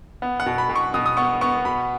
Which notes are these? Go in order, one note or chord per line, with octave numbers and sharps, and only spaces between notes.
B3
F#5
B2
B5
B2
C#6
B2 D#6
D#6
B3 C#6
B3 C#6
B2 B5